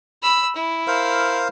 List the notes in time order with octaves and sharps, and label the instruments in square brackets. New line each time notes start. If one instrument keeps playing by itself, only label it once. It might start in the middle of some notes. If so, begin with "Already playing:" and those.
[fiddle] B5 E6
E4
[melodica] A#4 C5 F5